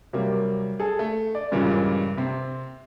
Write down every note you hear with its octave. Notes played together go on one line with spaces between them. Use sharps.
C3 F#3 G3 A#3
G#4 A4
A3
D5
G2 A#2 C#3 E3 G3 G#3
C3 C4